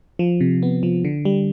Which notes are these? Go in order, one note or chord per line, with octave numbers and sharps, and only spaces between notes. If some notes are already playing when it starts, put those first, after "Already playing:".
F3
C3
B3
F3
D3
G3